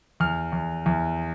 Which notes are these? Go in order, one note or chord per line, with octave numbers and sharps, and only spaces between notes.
E2 F6
E2
E2